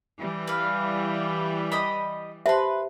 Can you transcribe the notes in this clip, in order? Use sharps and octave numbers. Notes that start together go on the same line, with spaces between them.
E3 G3
B4 F5
G4 D#5 B5
G4 B4 C5 E5 A5 C6